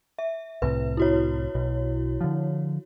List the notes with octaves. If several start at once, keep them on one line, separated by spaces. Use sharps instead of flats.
E5
C2 A2 C3 B4
E4 F#4 C#5
B1 B2
D3 F3